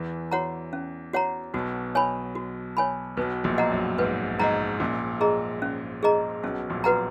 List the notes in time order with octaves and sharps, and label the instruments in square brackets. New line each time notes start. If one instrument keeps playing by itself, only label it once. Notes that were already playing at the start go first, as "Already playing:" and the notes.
Already playing: [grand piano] E2 E3
[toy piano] F#4 C#5 F#5 A#5
C#4
F#4 C#5 F#5 A#5
[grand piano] B1 B2 [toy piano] F#4
[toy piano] C#5 G#5 B5
F#4
C#5 G#5 B5
[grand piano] B1 B2 [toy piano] B4
[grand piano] A#1 A#2
[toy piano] D#5 F#5 A#5
[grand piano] F#2
[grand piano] G#2 [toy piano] B4
[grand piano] G#2 [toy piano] D#5 F#5 A#5
[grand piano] A#1 A#2 [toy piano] C#4
[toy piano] G#4 D#5 A#5
C#4
G#4 D#5 A#5
[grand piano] B1 B2 [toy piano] C#4
[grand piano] A#1 A#2
[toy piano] F#4 B4 F#5 A#5